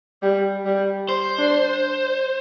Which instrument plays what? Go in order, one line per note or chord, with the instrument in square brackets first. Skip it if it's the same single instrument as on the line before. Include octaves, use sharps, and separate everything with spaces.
[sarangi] G3
G3
[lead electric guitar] C5
[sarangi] D4